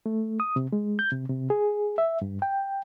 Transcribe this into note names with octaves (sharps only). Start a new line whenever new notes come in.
A3
D#6
C3
G#3
G6
C3
C3
G#4
E5
G2
G5